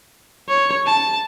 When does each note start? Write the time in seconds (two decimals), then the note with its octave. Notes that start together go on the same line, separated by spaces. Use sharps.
0.49 C#5
0.86 A5